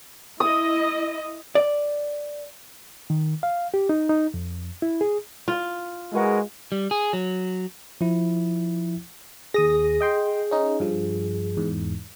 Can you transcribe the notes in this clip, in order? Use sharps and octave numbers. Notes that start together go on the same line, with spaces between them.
E4 D#5 D#6
D5
D#3
F5
G4
D#4
D#4
F2
E4
G#4
F4
G#3 E4 F#4 G#4 A#4 B4 F#5
G3
G#4
F#3
F3 E4
D#2 G#4 D#6 A#6
D#5 G5 C6
C#4 D#4
G2 F3
E2 G#2